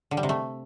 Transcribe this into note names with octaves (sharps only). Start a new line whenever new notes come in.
D3
G3
C3
A3